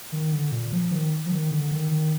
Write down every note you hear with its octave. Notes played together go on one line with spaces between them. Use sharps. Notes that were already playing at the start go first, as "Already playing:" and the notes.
D#3
D3
A#2
F3
D#3
F3
D#3
D3
D#3
D#3